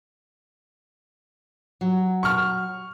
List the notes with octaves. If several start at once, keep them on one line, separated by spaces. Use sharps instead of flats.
F#3
C#6 F6